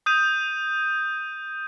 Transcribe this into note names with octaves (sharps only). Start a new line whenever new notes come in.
D#6 G6 D#7